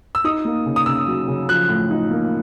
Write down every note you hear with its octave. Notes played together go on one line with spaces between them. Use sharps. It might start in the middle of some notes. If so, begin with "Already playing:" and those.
E6
D#4 D#6
A#3
C#3
D#6
C#3 E6
F#3
C#3
F3 F#6
A2
D#4
A#3